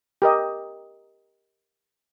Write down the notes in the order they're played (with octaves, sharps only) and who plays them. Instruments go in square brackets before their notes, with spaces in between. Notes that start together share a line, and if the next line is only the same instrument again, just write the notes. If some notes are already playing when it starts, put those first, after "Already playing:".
[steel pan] G4 A#4 D#5